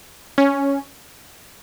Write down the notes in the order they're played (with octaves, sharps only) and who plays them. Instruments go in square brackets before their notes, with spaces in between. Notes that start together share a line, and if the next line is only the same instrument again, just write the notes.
[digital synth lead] C#4